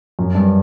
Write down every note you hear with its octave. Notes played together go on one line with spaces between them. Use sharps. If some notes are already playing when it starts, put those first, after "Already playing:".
F#2
G2